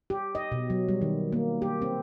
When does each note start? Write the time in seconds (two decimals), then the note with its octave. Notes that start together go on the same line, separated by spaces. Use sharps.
0.10 G4
0.35 D#5
0.52 B2
0.70 F#3
0.89 G3
1.02 D#3
1.32 A#3
1.62 G4
1.82 C4